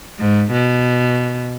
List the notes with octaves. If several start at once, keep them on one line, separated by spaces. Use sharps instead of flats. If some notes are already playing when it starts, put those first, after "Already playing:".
G#2
B2